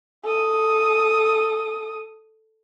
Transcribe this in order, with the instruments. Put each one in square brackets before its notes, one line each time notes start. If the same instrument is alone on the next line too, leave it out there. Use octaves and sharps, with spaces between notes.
[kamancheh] A4 D#6